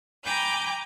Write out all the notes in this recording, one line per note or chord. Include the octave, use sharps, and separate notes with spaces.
G5 G#5 A#5 B5 D6 G6